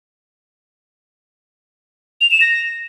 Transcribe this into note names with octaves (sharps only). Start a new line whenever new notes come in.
F7
E7
A#6